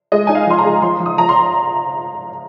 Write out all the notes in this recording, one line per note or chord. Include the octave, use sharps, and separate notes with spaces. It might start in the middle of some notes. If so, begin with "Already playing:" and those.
G#3 D#5
D#4 G#5
F5
F3 C6
A#5
G#3
F3 C6
F3
D#6
F3 A#5
C6